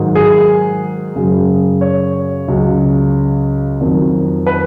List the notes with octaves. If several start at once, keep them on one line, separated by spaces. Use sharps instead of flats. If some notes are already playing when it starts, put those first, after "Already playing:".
Already playing: G#2 D#3 F#3
G#4
F#2 C#3 F#3
C#5
C#2 C#3 F#3
F2 D#3 F#3
B4